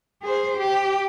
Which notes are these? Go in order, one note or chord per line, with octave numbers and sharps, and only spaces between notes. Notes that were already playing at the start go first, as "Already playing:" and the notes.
G#4 C5
G4